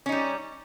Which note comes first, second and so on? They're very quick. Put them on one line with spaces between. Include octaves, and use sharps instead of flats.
C#4 D#4 G3